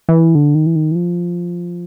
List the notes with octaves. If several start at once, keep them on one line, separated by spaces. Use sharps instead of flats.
E3
D3
D#3
E3
D#3
E3
F3